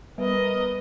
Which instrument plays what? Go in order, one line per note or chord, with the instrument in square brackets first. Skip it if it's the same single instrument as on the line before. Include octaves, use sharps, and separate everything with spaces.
[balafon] G3 B3 [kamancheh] A#4 D#5 [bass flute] B4